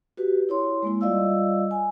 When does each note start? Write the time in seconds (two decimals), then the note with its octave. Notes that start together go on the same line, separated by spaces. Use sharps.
0.17 F#4 G4 B4
0.49 E4 C#5 C6
0.83 G#3 A#3 E4
1.01 G3 F4 D5 D#5 F5 E6
1.71 G#5